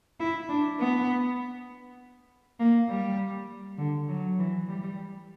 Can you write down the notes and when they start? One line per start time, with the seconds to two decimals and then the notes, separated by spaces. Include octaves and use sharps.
0.20 E4
0.49 D4
0.79 B3
2.59 A#3
2.89 G3
3.78 D3
4.08 F#3
4.39 E3
4.68 G3